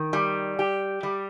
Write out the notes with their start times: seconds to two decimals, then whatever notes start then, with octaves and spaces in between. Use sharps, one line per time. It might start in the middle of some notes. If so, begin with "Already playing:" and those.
Already playing: D#3
0.13 G3
0.59 G4
1.03 G3